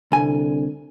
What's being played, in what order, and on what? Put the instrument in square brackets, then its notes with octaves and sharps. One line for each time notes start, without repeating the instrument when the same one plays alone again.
[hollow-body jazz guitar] C2 G#5 [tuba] D3